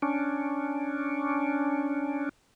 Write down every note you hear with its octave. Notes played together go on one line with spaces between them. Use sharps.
C#4 D4